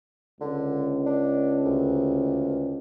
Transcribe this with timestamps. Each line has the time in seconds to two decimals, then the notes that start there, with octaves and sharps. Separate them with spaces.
0.41 C#2 D3
1.06 D4
1.65 D2